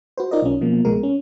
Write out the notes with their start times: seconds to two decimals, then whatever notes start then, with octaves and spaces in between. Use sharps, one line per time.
0.18 F#4 B4 C5
0.31 D#4 F4 A#4 D5 D#5
0.42 B1 C#4
0.61 B2 F3 A#3
0.85 C2 B2 G#3 A#4
1.03 C#4